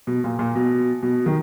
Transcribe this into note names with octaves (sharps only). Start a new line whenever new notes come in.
B2
A#2
A#2
B2
B2
D#3